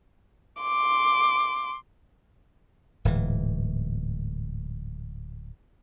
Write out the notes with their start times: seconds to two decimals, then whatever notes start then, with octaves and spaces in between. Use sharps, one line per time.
0.61 C6 D6
3.05 D1 G#2 E3